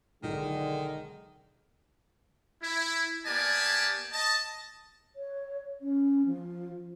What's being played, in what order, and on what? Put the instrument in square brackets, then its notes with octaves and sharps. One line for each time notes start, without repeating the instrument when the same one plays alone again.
[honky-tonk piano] B1 [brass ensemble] D3 G#3 [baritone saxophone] D#3
[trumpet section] E4
A#3 B3 G4 D5 G#5 A5
D#5 A5
[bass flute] C#5
C#4
F3